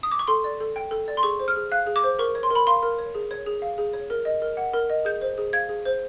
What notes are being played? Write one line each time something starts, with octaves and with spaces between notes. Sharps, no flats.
D#6
D6
C#6
A4 C6
D5
A4
G5
A4
D5
C6
G#4 C#6
C5
F6
G#4
F5 F#6
G#4
D6
C5
A#4 C#6
C#5
C6
A#4
B5
F5 C6
A#4
C#5
G#4
C#5
G#4
F5
G#4
C#5
A#4
D#5
A#4
F#5
A#4
D#5
G#4 G6
C5
G#4
F5 G#6
G#4
C5